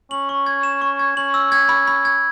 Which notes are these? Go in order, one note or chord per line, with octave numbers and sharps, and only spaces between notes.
C#4 F#7
C#6
G#6
E7
C#6
G#6
C#4 F#7
E6
G#6
B5
B5
G#6